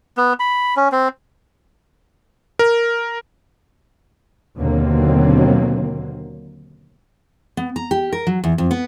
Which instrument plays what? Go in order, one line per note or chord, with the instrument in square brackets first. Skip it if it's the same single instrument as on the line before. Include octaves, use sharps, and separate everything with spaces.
[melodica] B3
B5
C#4
C4
[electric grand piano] A#4
[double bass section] D#2 B2 D3 F#3 A#3 C4
[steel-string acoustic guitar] B3
A#5
G4
A#4
F#3
E2
F2
B3